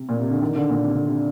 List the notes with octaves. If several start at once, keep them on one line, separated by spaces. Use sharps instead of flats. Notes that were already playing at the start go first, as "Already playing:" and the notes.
Already playing: C3
A#2
C3
D3
D#3
D3
A#2
C3
D3
C3